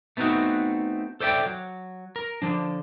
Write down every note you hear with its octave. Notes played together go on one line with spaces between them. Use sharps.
A3 B3 C4 D#4 F#4
A4 C5 D5 E5 G5
F#3
A#4
D3 F3 D4